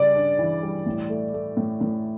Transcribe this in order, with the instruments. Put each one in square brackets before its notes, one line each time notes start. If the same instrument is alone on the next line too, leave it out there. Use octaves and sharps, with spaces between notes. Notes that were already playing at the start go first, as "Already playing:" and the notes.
Already playing: [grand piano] C#3 G3 [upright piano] D5
[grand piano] D4
E3
G3
A2
A3
A3
A2
A2